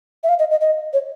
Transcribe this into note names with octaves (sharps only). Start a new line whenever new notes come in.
E5
F5
D#5
D#5
D#5
C#5